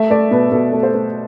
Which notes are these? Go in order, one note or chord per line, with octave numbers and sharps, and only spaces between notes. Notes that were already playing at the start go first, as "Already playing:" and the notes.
Already playing: A3 E5
A3 D5
B2 B4
B2 A4
A3
C5
A3